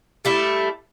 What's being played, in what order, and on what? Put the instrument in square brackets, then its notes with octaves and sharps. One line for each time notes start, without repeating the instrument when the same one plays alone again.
[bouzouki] G3 A3 E4